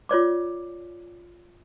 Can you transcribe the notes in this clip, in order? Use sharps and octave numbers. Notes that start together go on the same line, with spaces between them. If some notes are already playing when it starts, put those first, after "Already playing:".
F4 C#5 D5 D6